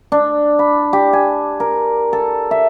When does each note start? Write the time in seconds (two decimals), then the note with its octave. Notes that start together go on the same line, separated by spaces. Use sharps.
0.12 D4
0.59 B5
0.93 G4
1.13 G#5
1.60 A#4
2.13 A4
2.51 E5